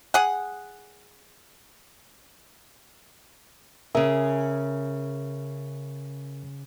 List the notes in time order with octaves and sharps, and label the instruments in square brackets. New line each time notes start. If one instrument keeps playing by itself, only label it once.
[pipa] G#4 F#5
[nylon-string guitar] C#3 G#4 [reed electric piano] A#4 E5